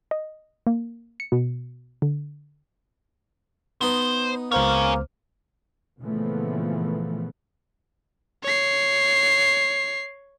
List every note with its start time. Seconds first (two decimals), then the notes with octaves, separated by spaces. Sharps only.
0.11 D#5
0.67 A#3
1.20 C#7
1.32 B2
2.02 D3
3.81 B3 D#4 C5
4.52 C#2 A#3 G#4 C5 C#5 F6
6.02 A#2 C#3 E3 F3 A3 B3
8.44 C#5 C7